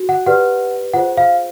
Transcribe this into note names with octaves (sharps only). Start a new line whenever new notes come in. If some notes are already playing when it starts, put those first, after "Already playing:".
Already playing: F#4
F#5
G4 B4 D5 F#5
F4 G#4 C5 F#5
F5